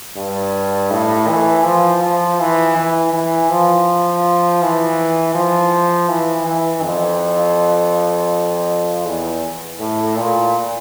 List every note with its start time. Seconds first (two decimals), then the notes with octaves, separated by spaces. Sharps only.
0.16 G2
0.91 A2
1.28 E3
1.65 F3
2.02 F3
2.39 E3
2.76 E3
3.13 E3
3.49 F3
4.62 E3
5.35 F3
6.09 E3
6.46 E3
6.83 F2
9.06 E2
9.80 A2
10.17 A#2